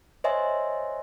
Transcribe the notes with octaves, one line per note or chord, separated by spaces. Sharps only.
C5 C#5 D#5 E5 G#5 C6